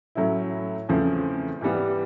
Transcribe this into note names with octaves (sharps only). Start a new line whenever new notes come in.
A2 F#3 A3 C#4 E4
E2 C#3 F3 A3 C4
G#2 E3 G3 B3